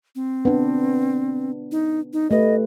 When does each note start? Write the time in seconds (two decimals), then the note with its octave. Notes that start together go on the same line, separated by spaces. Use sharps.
0.15 C4
0.45 B3 D4
1.72 D#4
2.13 D#4
2.31 A3 G4 B4 D#5